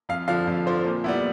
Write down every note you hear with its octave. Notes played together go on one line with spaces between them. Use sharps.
F2 F5
D3 F3 F5
F2
D3 F3 C5
A#2
G3 B3 E4